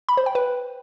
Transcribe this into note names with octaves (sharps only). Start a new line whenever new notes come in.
B5
C5
G5
B4